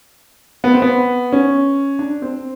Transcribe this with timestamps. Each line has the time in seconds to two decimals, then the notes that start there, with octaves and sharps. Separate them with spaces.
0.64 B3
0.74 C4
0.82 B3
1.32 C#4
1.99 D4
2.22 C4